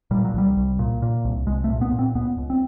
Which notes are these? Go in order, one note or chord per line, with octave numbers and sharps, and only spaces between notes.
A#2 G3
F#3
C2 G3
C2
A#2
A#2
C2
C2 G#3
A3
A#2
B3
A#2
C4
C#2 B3
C#2
C4